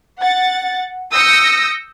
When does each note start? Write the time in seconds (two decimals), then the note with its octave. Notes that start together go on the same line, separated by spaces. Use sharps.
0.20 F#5 A6
1.12 D#6 E6 G6 A#6 C#7